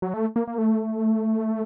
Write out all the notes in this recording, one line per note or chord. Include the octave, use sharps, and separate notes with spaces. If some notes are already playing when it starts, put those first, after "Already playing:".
F#3
A3
A#3
A#3
A3